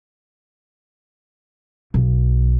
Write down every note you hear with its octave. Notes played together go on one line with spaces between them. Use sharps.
B1